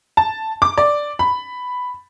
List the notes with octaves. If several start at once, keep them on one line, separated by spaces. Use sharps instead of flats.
A5
D6
D5
B5